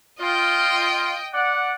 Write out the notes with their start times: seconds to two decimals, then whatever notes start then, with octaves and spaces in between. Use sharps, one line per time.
0.21 F4 D#5 G5
1.34 D5 F#5